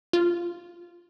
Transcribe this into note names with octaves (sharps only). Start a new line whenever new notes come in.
F4